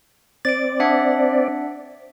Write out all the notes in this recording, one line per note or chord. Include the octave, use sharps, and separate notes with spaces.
C4 D5 A6 D7
D4 E5 F#5